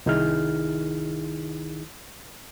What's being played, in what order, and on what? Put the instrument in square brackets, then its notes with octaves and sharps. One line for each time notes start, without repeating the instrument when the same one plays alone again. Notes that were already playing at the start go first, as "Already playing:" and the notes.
[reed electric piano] C2 D#3 D#4 E4 G#4 F6